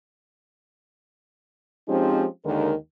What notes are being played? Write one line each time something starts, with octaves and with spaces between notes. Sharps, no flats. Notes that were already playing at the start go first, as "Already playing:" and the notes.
F3 G#3 C4 C#4 D#4 G4
D#2 D3 D#3 G#3 A#4